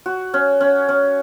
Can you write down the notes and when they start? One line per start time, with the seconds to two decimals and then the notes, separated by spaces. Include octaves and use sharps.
0.06 F#4
0.34 C#4
0.61 C#4
0.88 C#4